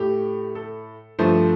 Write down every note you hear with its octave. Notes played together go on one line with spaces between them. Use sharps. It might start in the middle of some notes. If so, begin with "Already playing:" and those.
Already playing: A2 A3 G4
A4
G2 F3 A3 C5